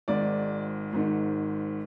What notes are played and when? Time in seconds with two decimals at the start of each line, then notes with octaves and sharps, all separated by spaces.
0.08 G#1 G#2 D#3 D5
0.93 G#1 G#2 D#3